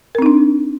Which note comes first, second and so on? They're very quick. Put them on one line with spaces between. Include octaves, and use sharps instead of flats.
A#4 C4 D#4 D4